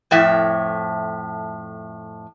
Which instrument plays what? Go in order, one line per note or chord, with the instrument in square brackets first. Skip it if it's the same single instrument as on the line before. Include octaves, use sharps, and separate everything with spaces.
[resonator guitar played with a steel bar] F2 A2 E5